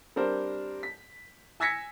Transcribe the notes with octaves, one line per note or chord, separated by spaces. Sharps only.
G3 C4 D4 A#4 C5
B6
G#5 E6 G#6 A#6 B6 C#7